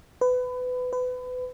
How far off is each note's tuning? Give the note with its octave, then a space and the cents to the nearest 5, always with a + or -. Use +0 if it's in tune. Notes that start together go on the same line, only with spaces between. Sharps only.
B4 +25
B4 +30